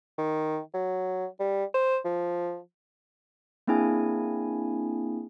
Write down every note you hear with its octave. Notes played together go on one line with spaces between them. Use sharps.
D#3
F#3
G3
C5
F3
A#3 C4 D4 E4 G#4 G#5